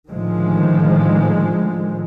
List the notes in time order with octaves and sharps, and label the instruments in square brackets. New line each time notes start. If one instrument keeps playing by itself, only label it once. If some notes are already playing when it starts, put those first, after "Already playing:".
[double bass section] A2 D3 D#3 F3 G#3